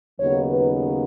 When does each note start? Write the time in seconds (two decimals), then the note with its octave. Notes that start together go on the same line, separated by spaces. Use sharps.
0.20 D#2 C#3 F#3 B3 D#4 C#5
0.48 B4